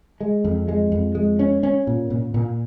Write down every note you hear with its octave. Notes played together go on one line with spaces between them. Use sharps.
G#3
F2
G#3
F2
G#3
C#4
C#4
A#2
A#2
A#2